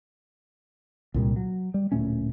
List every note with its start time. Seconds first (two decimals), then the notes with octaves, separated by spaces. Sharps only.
1.14 C2 A#2 G3
1.36 F#3
1.74 G3
1.92 D1 A#2 A3 C#4